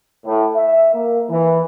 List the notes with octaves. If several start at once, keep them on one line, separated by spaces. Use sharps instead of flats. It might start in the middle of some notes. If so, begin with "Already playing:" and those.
A2
E5
A#3
E3